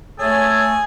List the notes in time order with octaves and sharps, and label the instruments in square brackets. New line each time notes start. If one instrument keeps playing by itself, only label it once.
[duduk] A3 [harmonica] G#4 G#5 [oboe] A4 [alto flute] C#5